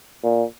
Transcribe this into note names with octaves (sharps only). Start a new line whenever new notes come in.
A#2